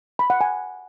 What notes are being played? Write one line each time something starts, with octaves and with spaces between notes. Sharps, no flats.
B5
F#5
G#5